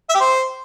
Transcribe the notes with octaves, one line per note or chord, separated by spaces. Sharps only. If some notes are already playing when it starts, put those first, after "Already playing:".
E5
G4
C5